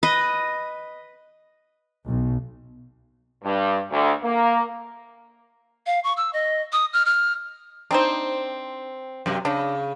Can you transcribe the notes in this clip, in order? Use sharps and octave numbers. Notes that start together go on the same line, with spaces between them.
B4 D#5
B1
G2
D2
A#3
F5
C#6
E6
D#5
D#6
F6
F6
C4 D4 D#4 C5
F#2 C3
C#3 D4